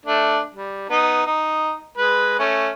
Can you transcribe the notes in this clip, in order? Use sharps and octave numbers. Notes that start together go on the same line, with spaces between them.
A3 D4
G3
B3 D#4
D#4
G#3 B4
A3 C#4